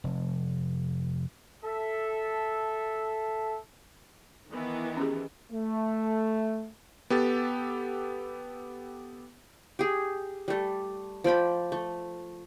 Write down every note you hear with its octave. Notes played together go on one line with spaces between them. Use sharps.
F1
A4 E5
D#3 E3 B3
C#4 G4 G#4
A3
B3 G4 A4 A6
G4 G#4
G3 A3
F3 D5 G5 B5
A3